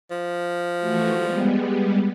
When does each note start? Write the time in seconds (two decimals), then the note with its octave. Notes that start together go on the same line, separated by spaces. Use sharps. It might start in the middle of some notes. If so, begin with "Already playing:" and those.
0.11 F3
0.79 E3 A3 F#4
1.17 G3 G#3 B3